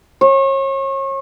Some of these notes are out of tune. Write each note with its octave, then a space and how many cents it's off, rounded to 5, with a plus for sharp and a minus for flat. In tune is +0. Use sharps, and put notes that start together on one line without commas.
C#5 -35